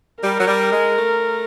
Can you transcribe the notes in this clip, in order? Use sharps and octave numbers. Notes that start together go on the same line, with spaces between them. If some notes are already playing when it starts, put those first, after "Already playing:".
G3 A#4
F#3
G3
G#3
A3